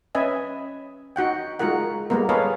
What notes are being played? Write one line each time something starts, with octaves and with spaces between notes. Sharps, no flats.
C#4 B4 D#5 E5 G#5
D#4 F#4 F#5 G5
G#3 D#4 F4 F#4 A#4 F#5
G3 G#3 A#3 B3 A#4
G#4 A4 B4 C#5 D#5 F5